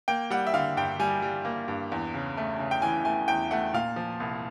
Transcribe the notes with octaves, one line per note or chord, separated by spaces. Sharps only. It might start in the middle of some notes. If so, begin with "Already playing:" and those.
A#3 G5
G3 F#5
E5
D3 F5
G2 G5
G3 G#5
G3
A#3
G2
E2
C#3
A3
C#3
G5
E3 G#5
A3 G#5
E2 G5
A3 F#5
A#2 F5
F3
C2